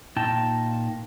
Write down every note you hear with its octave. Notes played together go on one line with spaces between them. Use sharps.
A#2 D#4 G5 A5